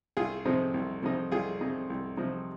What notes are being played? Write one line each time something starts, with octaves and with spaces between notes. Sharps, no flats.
C2 F4 G#4
C3 F3 C4 D#4
C2
C3 F3 C4 D#4
C2 F4 G#4
C3 F3 C4 D#4
C2
C3 F3 C4 D#4